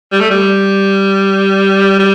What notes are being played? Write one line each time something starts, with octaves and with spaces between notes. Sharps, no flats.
G3
A3
G3
G3